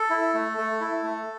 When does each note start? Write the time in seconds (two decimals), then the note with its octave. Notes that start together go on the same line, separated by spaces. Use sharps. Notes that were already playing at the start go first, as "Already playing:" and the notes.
Already playing: A4
0.10 E4
0.34 A3
0.57 A3
0.81 E4
1.03 A3